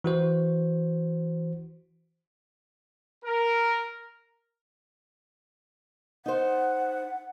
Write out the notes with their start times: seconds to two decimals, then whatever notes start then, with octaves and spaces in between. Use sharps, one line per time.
0.04 E3 F#4 C5
3.24 A#4
6.26 D#4 C5 F#5